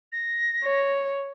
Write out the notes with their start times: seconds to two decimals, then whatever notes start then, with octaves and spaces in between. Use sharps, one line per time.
0.12 A#6
0.64 C#5